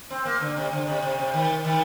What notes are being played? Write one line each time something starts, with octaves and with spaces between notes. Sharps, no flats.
C4
A#3
D3
C3
D3
C3
C3
C3
D#3
D#3